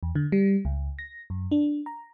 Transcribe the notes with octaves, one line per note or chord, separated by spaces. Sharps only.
E2
D3
G3
C#2
A#6
F#2
D4
A#5